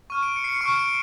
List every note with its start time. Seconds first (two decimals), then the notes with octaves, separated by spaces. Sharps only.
0.10 C#6 F6 D#7
0.23 D7
0.36 C#7
0.44 C7
0.48 C#7
0.61 C#6 F6 D7
0.79 D7